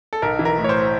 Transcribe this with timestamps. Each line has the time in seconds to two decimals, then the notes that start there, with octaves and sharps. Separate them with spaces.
0.13 A4
0.22 B1 A#4
0.39 E3
0.45 A#4
0.58 A2
0.64 C#5
0.69 C5